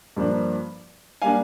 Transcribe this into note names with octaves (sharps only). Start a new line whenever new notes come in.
G2 F3 A#3 D4
G3 A#3 D4 F5 G#5